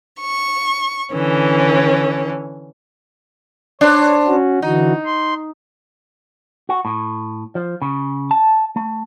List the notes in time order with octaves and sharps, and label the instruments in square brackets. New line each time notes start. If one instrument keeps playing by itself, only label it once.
[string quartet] C#6
D3 E3 C#4
[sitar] D4 C5 [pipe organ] C#5
[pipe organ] C#4 F#4
[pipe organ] D3 E3 F#4 [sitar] D#4
[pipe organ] C6
[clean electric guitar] F#4
A2
F3
C#3
A5
A3